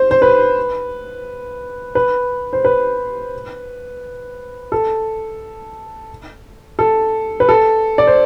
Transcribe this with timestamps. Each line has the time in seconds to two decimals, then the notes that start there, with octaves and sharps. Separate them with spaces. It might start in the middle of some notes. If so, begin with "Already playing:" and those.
Already playing: C5
0.11 C5
0.22 B4
1.95 B4
2.53 C5
2.65 B4
4.72 A4
6.79 A4
7.40 B4
7.49 A4
7.98 D5
8.07 C5